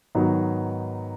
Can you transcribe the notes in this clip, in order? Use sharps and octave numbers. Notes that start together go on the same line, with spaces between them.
G#2 D#3 F#3 B3 D#4